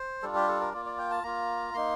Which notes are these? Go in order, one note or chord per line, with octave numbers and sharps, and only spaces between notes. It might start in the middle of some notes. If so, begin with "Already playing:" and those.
Already playing: C5
G3 D4 F4 A4
G4
A4
A#4
A#3 F4 D5
D5
G5
A5
A#3 F4 A#5
A#3 D#4 C6